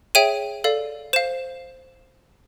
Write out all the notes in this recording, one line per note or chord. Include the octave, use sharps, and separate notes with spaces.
G#4 C#5 E5 G5 D#7
A4 D5 F5
C5 F5 E7